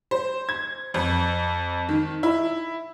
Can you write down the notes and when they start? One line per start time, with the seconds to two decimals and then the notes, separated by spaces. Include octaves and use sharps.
0.11 C5
0.49 G#6
0.94 F2
1.89 D#3
2.23 E4